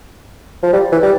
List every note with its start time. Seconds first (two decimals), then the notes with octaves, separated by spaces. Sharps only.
0.63 F3
0.73 G3
0.92 E3
1.03 G3